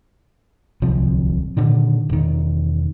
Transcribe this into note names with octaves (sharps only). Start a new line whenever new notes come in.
D1 C2 C3 F3
A#2 D3 D#3
E1 D#3